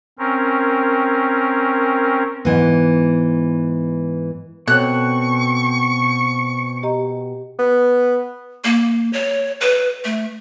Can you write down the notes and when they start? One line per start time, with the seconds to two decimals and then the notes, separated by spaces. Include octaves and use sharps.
0.19 C4 C#4 A#4
2.45 G#2 E3 B3
4.68 B2 C4 A4 C#5 C#6 F#6
6.83 G4 D#5 A#5
7.59 B3
8.64 A#3
9.13 C#5
9.61 B4
10.05 A3